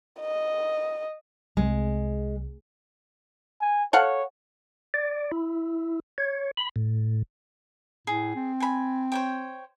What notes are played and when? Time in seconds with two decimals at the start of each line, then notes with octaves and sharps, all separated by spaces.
0.21 D#5
1.57 C2 C3 G#3
3.62 G#5
3.93 A4 C#5 F5 F#5
4.94 D5
5.32 E4
6.18 C#5
6.57 B5
6.76 A2
8.07 A2 G#4
8.35 C4
8.60 G#5 B5
9.12 C5 C#5 G5